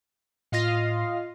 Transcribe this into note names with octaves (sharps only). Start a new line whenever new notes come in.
A2 F4 D#5 F5 A#6